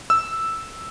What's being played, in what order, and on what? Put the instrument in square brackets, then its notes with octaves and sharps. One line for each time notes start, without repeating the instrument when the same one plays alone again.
[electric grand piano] E6